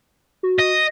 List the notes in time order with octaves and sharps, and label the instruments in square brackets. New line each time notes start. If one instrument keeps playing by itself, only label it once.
[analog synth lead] F#4
[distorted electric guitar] D#5